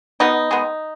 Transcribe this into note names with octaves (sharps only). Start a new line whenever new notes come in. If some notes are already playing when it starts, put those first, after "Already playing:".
B2 B3 D#4
G#3 B3